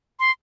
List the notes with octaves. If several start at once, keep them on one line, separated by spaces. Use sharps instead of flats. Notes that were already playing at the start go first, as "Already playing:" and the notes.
C6